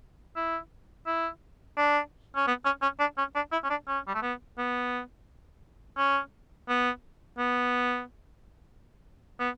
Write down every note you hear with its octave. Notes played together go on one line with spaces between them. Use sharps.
E4
E4
D4
C#4
B3
C#4
C#4
D4
C#4
D4
E4
C#4
D4
C#4
G3
A3
B3
B3
C#4
B3
B3
B3